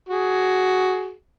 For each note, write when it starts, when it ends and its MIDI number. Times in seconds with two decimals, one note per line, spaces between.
0.09 1.13 66
0.09 1.13 68